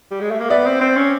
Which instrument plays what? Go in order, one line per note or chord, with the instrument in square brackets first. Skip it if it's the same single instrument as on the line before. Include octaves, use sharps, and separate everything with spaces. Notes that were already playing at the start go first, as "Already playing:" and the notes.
[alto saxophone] G3
G#3
A3
A#3
[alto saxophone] B3 [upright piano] D5 E5
[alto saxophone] C4
C4
C#4